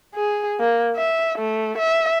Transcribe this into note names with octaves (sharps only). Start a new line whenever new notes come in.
G#4
A#3
E5
A3
E5